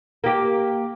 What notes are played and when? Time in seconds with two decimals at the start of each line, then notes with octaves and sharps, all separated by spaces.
0.24 A#3 G4